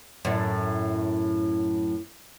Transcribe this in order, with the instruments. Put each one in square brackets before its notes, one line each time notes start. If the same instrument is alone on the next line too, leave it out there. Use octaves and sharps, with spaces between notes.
[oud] F#2 A2